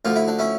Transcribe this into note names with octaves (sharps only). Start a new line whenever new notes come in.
D2 D3 F3 F4
E4
D4
C#4 E4